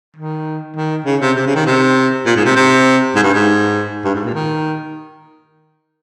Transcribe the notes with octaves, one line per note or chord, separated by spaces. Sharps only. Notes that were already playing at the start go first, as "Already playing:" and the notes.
D#3
D#3
C#3
C3
C3
C#3
D#3
C3
A#2
G#2
C3
C3
G#2
G2
G#2
G2
G#2
A#2
D#3